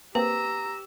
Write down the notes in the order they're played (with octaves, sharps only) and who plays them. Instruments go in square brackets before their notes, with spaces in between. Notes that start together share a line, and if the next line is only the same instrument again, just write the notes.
[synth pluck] A#3 C4 G#4 [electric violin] G4 E6 [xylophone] B4 [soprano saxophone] A#5